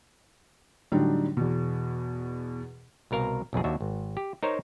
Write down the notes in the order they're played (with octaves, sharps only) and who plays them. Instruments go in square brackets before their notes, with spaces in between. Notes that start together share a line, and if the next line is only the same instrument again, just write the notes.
[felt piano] A2 D3 F#3 G3 D4 D#4
E2 B2
[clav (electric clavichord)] C2 B2 A#4 F5
B1 F2 B2 G#4
D#2 D4 F#4 E5
G#1
G4
D#4 A#4 C5 C#5